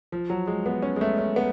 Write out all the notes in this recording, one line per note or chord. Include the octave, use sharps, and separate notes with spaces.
F3
F#3
G#3
B3
C#4
G#3
A3
C#4
B3